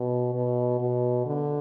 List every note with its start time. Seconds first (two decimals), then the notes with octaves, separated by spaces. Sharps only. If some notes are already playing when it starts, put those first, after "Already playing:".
Already playing: B2
0.34 B2
0.80 B2
1.26 D3